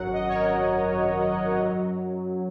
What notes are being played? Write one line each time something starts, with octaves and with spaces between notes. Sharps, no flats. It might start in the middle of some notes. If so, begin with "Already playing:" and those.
Already playing: G#1 F#2 F#3 F#5
D#5
C#5
A#4
F#2 F#3